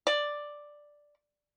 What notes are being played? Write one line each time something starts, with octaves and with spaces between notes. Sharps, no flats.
D5